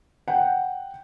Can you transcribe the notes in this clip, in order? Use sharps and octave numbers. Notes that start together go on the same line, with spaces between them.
F#5 G5